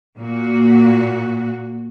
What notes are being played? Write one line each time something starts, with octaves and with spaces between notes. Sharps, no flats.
A#2 A#3 F#4